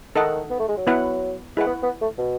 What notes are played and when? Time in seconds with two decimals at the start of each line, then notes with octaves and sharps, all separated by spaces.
0.16 D#3 D#4 A4 D#5 F#5
0.51 B3
0.59 A3
0.68 G#3
0.77 F#3
0.87 B3 E4 B4 F#5
1.57 G#3 E4 B4 F#5
1.66 B3
1.83 B3
2.01 A3
2.18 B2